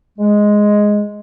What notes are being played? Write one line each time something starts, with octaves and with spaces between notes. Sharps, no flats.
G#3